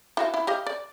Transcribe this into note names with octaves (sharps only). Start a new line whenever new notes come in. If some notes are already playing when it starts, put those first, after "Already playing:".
E4 F#4 F5
E4
G4 D#5 F5
D5